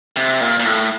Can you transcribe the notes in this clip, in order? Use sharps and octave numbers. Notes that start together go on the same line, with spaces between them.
C3
A#2
A#2
A2